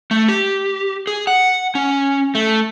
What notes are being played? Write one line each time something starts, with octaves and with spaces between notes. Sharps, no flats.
A3
G4
G#4
F#5
C#4
A3